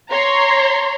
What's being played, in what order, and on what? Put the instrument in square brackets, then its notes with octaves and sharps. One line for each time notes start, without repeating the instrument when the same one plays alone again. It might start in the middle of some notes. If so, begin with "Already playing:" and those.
[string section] C#5 A#5 C6